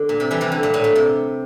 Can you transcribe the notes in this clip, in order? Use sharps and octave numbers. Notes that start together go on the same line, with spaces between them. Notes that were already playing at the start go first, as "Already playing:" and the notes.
Already playing: D3
A#2
C3
E3 G3
C3 E3
D3
A#2
A2
A#2
C3